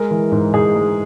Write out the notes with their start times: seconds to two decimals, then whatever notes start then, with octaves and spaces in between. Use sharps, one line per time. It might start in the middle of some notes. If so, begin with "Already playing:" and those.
Already playing: G#3 A#4
0.11 E3
0.32 G#2
0.54 G#2 G#4
0.75 G#3